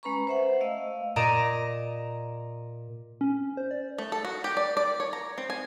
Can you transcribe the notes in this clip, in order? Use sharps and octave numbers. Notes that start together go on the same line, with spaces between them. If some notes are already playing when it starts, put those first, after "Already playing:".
G#3 C#4 B4 A#5 B5 C#6
C5 E5 F#5
A3 D#5 F5 E6
A#2 D5 D#5 A#5 D7 E7
C#4
C5
D5
A3
A4
F#4
G4
D5
D5
C#5
A#5
C4
G#5